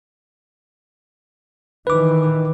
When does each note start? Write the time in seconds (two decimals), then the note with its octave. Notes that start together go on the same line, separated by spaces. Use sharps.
1.87 D#3 E3 B4 D6